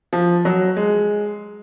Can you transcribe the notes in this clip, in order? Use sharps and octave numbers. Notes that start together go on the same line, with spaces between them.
F3
F#3
G#3